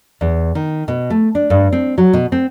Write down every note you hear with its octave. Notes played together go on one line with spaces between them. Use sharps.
E2
D#3
B2
A3
D4
G2
C4
F#3
B2
C4